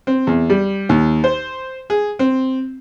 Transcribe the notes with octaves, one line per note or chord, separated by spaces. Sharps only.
C4
E2
G3
D#2
C5
G#4
C4